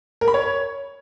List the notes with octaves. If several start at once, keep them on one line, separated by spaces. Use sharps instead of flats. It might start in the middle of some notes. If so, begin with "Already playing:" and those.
A#4
B5
C#5